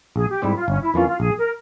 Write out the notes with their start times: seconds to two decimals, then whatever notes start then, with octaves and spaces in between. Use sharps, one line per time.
0.16 A#1 G#4
0.29 G4
0.42 G#2 G3 C4 E4 G4
0.55 F4
0.68 G1 C#4
0.80 E4
0.94 F2 E3 A#3 C#4 F4
1.07 F4
1.20 A#1 G#4
1.37 A#4